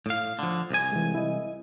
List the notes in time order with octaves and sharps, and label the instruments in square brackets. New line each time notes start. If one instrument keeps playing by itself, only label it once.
[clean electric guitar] A2 F5
D3 F3
C2 G#5
[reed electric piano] E3 G#3
E4 D#5